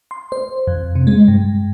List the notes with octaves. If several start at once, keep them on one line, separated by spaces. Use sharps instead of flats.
C6
C5
F2
C3
G#3
G2